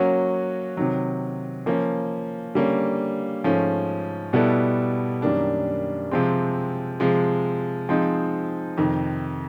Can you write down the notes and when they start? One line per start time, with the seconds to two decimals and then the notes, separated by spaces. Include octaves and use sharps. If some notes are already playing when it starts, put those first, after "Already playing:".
Already playing: F#3 A#3 C#4 F#4
0.77 C3 D#3 F#3
1.66 F3 A#3 C#4
2.55 D3 G3 A#3 C#4
3.44 G#2 F3 A3 C#4
4.33 B2 G3 B3 E4 A4
5.22 F#2 D#3 G3 A#3 D4
6.11 C3 F3 G#3 C4
7.00 C3 F3 G#3
7.89 F3 G#3 C4 D#4
8.77 F2 C3 D#3